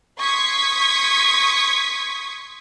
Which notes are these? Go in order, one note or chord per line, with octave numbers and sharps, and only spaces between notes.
C6 C#6 D#6 G#6 B6 C#7